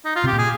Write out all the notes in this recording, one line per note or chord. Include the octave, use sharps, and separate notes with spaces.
D#4
F4
C3
G4
A#2
G#4